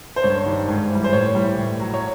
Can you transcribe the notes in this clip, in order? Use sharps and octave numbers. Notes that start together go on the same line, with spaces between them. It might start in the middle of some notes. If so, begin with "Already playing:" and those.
C5
G2 C#5
D#3 G3
G#2
E3
G3
C5
A2 C#5
E3 G3
A2
F#3
C#5